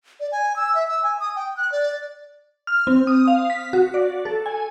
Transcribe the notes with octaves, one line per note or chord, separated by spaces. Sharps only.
D5
G#5
E6
E5
E6
G#5
D#6
G5
F#6
D5
F6
C4
D#6
F5
B6
F#4
D5
A4
G#5